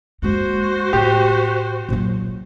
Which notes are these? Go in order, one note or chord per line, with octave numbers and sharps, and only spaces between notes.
G#3 A#3 F#4 C5
A2 G4
A#2 F#3